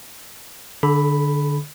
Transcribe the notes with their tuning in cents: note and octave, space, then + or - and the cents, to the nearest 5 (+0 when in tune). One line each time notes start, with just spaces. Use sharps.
D3 +5 A4 -45 B5 +0